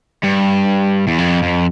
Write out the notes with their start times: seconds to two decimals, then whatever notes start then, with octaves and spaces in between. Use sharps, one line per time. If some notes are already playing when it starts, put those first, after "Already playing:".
0.24 G2
1.08 E2
1.18 F2
1.43 F2